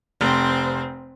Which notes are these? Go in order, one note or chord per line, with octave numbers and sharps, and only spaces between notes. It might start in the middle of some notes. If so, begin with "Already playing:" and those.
F1 C4 C5